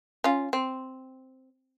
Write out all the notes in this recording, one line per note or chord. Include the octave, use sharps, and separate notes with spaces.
C#4 F4
C4